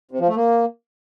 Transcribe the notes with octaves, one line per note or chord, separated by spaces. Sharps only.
C3
F3
A3
A#3